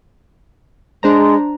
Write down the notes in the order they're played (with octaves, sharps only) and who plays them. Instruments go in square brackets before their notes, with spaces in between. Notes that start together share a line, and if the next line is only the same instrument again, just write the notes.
[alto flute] G#3 [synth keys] D4 C5 A#5